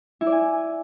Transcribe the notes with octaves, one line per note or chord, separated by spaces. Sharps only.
E4
D5
G#5